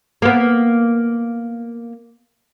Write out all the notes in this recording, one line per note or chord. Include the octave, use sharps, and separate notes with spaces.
A#3 B3